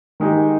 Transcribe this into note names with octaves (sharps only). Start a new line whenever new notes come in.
D#3 G#3 D#4 G4